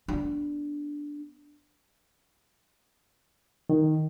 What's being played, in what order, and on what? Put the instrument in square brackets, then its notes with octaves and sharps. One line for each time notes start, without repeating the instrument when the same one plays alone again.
[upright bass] B3 D4
[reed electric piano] D#3